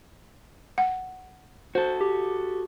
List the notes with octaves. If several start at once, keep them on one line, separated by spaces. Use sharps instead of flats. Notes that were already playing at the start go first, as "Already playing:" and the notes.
F#5
F#4 A4 C5
G4